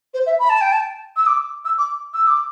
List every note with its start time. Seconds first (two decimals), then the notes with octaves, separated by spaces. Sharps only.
0.14 C5
0.26 E5
0.39 B5
0.50 A5
0.61 G5
0.72 A5
1.16 E6
1.27 D6
1.65 E6
1.78 D6
2.14 E6
2.27 D6